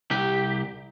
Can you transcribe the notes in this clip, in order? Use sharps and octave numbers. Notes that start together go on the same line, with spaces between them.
C2 G4